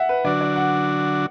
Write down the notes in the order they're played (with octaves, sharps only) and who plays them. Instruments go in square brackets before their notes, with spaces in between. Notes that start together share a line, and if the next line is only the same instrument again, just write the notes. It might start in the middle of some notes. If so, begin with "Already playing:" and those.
Already playing: [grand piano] E5 F#5
B4
[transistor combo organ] D3 F#3 D4 F#4 [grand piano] D5
[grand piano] D5
F#5